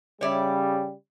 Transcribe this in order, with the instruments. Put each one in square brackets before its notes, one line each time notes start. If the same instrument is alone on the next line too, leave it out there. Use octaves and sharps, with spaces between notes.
[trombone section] C#3 G3 [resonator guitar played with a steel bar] C#5 D5 E5